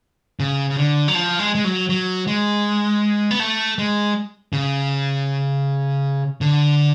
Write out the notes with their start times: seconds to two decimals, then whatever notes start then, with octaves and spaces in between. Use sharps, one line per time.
0.40 C#3
0.70 C#3
0.77 D3
1.08 F#3
1.15 F3
1.39 G#3
1.55 G#3
1.64 F#3
1.89 F#3
2.27 G#3
3.31 B3
3.40 A3
3.78 G#3
4.53 C#3
6.41 D3